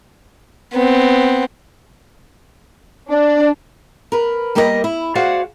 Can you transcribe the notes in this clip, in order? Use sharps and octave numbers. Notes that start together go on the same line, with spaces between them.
B3 C4
D4 D5
A#4 B4
G3 A#3 G4 A#4 B4 D#5
E4
F#4 G#4 C5 D5 F5 F#5